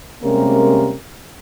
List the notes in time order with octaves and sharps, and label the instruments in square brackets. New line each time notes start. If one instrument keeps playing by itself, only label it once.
[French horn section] C3 G3 G#3 A#3 C#4 A#4